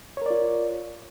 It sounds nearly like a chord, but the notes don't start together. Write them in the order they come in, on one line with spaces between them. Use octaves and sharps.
C#5 A#4 D5 F4